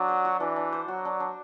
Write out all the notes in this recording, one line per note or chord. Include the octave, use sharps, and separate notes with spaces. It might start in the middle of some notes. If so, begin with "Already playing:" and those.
Already playing: F#3 D4
C5
F#4
E3 D4
D4
C5
F#3 F#4
D4
D4